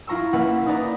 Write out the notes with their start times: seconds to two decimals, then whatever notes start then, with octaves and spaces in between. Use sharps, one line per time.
0.07 E4 F4 A#5 C#6 E6
0.33 A#3 C#4 B4 E5 F#5
0.66 D#4 E4 B4 D5 A#5 D6